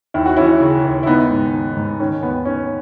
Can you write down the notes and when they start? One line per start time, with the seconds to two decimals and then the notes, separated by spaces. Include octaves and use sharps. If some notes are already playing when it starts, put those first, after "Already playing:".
0.14 D#2 E4
0.26 F#4
0.37 E3 C#4 E4
0.61 C#3
0.84 D#2
1.03 E4
1.07 D#3 B3 D#4
1.30 G#2
1.52 D#3
1.77 G#2
2.00 D#3 C#4
2.23 D#2 B3
2.45 D#3 C#4